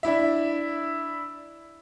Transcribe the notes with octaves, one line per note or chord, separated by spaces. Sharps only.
D4 E4 E5